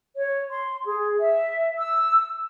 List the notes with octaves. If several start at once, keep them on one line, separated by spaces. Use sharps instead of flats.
C#5
C6
G#4
E5
E6